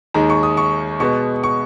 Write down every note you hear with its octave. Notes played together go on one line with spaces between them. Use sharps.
D#2 D#3 G#3 A#5
C#6
D#6
C#6
B2 G#3 B3 C#6
C#6